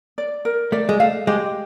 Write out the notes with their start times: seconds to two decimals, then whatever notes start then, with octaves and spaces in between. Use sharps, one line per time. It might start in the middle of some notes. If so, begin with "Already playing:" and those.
0.18 D5
0.45 A#4
0.72 A3 D5
0.89 G#3
1.00 A3 F5
1.27 G#3 G4